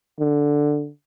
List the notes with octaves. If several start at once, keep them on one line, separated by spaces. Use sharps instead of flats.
D3